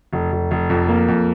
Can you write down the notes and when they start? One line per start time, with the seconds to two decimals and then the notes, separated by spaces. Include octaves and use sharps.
0.13 F1
0.32 F1
0.51 F1
0.70 F2
0.89 A#3
1.08 F2